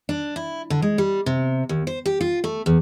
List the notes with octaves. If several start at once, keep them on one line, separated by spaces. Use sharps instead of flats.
D4
E4
D3
G#3
G3
C3
D#2
C5
G4
F4
A3
E2